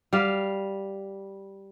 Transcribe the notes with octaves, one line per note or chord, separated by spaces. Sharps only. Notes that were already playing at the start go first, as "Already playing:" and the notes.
G3 F5